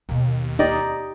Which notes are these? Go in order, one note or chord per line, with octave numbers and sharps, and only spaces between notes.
D#2 B2 B3
C4 D#4 G4 D5 D#5